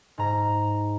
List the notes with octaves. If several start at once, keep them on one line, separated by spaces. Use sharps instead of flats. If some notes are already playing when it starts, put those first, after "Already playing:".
G#2 A#5